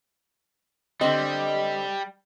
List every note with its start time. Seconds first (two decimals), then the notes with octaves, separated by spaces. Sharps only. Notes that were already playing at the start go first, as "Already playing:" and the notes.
1.01 D3 G3 C4 D#5